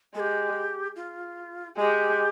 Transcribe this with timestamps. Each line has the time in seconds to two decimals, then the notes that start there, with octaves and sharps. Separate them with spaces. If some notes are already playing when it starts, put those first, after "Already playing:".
0.15 G#3 G4 A4
0.96 F4
1.77 G#3 G4